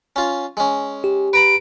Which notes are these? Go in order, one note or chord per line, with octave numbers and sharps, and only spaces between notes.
C#4 F4
G#3 C#4
G4
B4 A#5 B5 D7